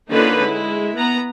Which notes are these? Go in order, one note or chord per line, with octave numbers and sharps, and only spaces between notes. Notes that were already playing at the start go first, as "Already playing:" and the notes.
D3 A#3 C#4 D#4 F4 B4
G#3 E4
B3 A#5